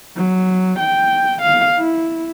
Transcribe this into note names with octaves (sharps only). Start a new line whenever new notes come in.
F#3
G5
F5
E4